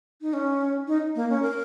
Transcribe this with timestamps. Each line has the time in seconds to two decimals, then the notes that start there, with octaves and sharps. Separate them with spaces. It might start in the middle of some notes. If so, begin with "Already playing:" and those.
0.22 D#4
0.33 C#4
0.87 D#4
1.16 A#3
1.30 C#4
1.42 A#4